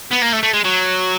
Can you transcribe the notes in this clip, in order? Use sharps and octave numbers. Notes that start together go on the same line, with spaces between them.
B3
A#3
A3
A3
G#3
F#3